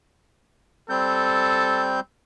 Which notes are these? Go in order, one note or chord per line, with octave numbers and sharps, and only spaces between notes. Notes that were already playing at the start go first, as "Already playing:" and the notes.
G3 C4 A4 G6